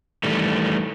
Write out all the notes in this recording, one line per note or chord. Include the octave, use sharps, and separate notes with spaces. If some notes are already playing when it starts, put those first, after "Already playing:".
D#3 E3 G3 A3